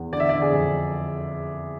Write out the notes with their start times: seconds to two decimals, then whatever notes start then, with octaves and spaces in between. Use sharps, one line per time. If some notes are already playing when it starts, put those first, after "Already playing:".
Already playing: E2
0.12 D3 D5
0.20 E5
0.29 D3 D5
0.42 G#4
0.52 F2